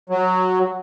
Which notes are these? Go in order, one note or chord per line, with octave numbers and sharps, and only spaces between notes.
F#3